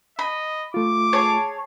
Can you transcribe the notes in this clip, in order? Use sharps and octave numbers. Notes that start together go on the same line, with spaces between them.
D#5 B5
A3 F4 D6
G#4 C#5 A5